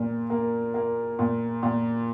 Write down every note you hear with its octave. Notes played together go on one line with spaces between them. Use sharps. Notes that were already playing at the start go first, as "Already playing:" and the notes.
Already playing: A#2 A#3
A#3
A#3
A#2
A#2